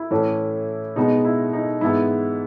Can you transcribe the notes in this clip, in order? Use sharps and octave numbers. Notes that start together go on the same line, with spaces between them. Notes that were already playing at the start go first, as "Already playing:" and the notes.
Already playing: E4
A2 E3 A3 C#4
B2 G#3 B3 D#4
E4
D#4
G#2 E3 G#3 B3 E4